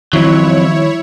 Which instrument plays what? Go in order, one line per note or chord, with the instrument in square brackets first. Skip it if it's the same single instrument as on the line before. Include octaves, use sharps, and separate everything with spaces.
[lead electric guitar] F2 F#3 [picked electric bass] D#3 G3 [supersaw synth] E4 C#5